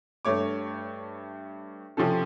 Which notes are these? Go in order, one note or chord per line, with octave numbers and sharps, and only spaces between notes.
G2 A3 C#5 D6
C3 F3 C4 C#4 A4